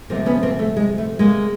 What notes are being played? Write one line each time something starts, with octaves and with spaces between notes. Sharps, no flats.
D2 C3 F3 G#3 A#3 C4
B3 C#4
A#3 C4
A3
G#3
A3
G#3 A#3